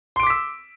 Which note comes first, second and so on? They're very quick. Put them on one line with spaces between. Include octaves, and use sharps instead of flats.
C6 D7 D6 B6 E6